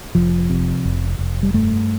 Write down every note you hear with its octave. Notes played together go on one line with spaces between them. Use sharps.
F1 F3
C3
F1
F1
G3
G2 A3